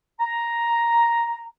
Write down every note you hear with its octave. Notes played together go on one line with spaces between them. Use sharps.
A#5